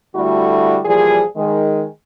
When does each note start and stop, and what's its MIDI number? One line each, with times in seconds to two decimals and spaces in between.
0.15 0.80 38
0.15 0.80 50
0.15 0.80 55
0.15 0.80 57
0.15 0.80 64
0.15 0.80 66
0.85 1.21 46
0.85 1.21 52
0.85 1.21 53
0.85 1.21 55
0.85 1.21 68
1.36 1.85 51
1.36 1.85 56